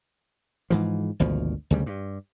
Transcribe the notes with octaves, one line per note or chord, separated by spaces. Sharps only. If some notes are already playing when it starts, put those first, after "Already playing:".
G#2 E3 F3
G#1 D2 B2 F3
D2 C#3 G3
G2